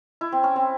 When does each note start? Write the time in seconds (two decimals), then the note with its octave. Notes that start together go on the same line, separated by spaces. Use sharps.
0.21 E4
0.32 C4
0.44 C#4
0.56 C4